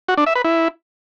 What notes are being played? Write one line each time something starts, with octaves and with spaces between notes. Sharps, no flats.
F#4
D4
E5
B4
E4